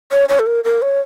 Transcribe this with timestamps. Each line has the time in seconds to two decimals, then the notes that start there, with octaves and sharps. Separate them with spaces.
0.12 C#5
0.29 C#5
0.39 A4
0.46 A#4
0.64 A#4
0.82 C#5